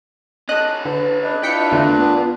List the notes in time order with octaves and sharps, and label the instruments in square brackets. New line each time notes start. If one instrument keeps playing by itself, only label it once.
[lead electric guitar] C#4 A4 [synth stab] D#5 F#6
[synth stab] D3 [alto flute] B4
[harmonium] D4 B4 [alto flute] D#5
[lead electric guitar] E4 F4 [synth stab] G5 B6 C#7
[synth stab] E2 D3 A3 [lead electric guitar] F4 D5
[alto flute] B3